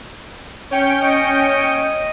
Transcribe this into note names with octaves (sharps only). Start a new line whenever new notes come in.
C#4 G5 C#7
D#5